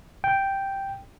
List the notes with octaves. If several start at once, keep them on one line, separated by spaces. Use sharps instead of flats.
G5